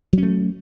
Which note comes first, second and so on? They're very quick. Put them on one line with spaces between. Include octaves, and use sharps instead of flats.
F#3 C#4 A3